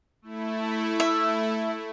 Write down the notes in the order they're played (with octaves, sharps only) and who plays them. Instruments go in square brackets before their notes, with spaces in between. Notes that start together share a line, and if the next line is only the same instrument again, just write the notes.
[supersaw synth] A3 E4
[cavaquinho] E5